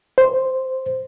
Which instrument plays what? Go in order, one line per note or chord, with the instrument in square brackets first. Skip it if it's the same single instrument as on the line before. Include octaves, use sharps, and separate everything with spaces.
[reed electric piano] C5